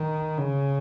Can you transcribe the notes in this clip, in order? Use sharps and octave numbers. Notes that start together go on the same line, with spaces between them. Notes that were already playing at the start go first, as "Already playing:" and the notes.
Already playing: D#3
C#3